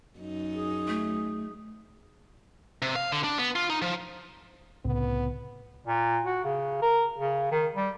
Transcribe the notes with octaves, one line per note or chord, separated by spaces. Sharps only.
F#2 D#4
G#4
A3
C3
F5
D3
D4
B3
F4
D#4
F3
C2 A2 C#3 B3
A#2
F#4
C#3
A#4
C#3
D#3
G3